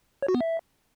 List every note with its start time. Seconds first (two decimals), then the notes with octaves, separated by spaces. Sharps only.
0.22 C#5
0.28 F#4
0.34 B3
0.40 E5